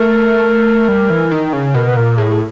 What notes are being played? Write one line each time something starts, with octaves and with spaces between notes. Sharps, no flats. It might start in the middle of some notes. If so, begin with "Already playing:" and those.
Already playing: A3 A#4
G3
E3
D#3
C#3
B2 A#4
B4
A#2 A#4
A2 G#4
G#4